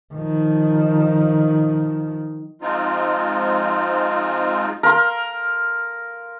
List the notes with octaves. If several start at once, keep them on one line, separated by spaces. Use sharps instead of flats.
D#3 F3
F3 G#3 C4 D#4 F4
A#4 F5 C6